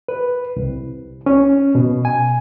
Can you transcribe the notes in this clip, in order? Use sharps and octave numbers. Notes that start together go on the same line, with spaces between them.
B4
C2
C#4
B2
G#5